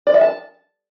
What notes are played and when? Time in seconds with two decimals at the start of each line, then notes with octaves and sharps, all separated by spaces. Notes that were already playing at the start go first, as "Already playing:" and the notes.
0.07 D5
0.14 E5
0.21 A5